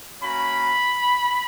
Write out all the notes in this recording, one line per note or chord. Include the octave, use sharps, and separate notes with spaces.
A#3 C#4 F#4 B5